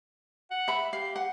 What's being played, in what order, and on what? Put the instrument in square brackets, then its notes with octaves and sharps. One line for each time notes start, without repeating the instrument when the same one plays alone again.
[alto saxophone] F#5
[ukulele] E5 B5
[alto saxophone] G4 [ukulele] F5
[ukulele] F#5